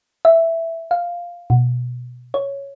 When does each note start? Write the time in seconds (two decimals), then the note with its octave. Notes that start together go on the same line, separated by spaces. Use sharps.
0.25 E5
0.91 F5
1.50 B2
2.34 C#5